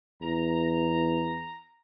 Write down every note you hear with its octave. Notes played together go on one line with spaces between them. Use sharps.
E2 A#5